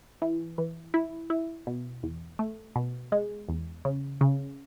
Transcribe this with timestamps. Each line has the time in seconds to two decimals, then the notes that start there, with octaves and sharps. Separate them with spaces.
0.22 E3
0.58 E3
0.94 E4
1.30 E4
1.67 B2
2.03 E2
2.39 A3
2.76 B2
3.12 G#3
3.49 E2
3.85 C#3
4.21 C#3